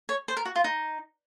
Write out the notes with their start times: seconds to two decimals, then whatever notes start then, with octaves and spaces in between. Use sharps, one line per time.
0.09 C#5
0.28 C5
0.37 A#4
0.45 F#4
0.56 F4
0.64 D#4